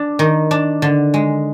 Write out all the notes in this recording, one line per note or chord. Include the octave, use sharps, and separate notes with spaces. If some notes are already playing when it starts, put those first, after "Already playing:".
Already playing: D4
D#3
D4
D3
G#3